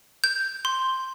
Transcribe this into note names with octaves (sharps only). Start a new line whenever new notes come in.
G6
C6